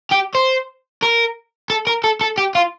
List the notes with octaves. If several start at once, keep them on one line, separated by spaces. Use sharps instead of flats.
G4
C5
A#4
A4
A#4
A4
A4
G4
F4